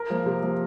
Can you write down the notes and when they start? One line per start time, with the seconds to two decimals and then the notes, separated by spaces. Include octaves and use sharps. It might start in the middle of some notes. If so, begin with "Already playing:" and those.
Already playing: A#4
0.10 F3 A#3
0.26 C3
0.42 F3 A#3